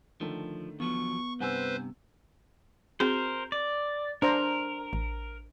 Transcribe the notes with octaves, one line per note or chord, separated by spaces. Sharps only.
D3 D#3 F3 A3
E2 F3 F#3 B3 C#6
G2 C3 B4 C5 F#5 G#5 E6
C4 F#4 G#4 A#4 C5
D5
D4 A#4 C5 A#5
A1